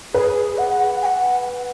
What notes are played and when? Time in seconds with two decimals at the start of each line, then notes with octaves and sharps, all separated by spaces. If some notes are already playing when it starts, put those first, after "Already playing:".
0.13 G#4 B4
0.57 F#5
1.02 G#5
1.06 F#5